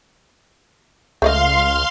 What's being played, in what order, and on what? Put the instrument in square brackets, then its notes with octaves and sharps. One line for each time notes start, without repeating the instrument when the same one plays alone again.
[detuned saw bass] C#2 [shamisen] A3 D5 D#5 [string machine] F5 C6